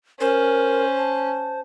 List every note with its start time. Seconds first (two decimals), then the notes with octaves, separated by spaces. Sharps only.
0.20 C#4 A#4 C5
0.98 A5